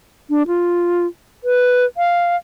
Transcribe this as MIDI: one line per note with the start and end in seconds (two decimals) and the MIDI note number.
0.30 0.43 62
0.47 1.06 65
1.44 1.85 71
1.97 2.36 77